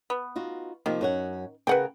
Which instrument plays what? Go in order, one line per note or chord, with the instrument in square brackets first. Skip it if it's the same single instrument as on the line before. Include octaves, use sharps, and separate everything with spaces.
[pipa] B3
[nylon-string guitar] D#4 F4 F#4
[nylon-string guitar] C3 F3 A#3 [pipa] D#3
[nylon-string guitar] F#2 C#5 F#5
[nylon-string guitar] C#3 G#4 A#4 [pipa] B4 F#5 G5